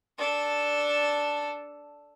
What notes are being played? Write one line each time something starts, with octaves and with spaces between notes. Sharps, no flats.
D4 A4